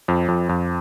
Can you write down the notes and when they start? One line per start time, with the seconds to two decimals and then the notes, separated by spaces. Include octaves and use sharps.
0.08 F2
0.28 F2
0.49 F2